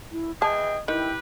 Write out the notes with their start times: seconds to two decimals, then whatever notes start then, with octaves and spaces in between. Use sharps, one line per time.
0.12 E4
0.42 E3 G#4 D#5 G5 A5
0.88 D#3 E4 G4 B4 G5